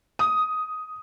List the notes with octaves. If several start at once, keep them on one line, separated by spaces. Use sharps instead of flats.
D#6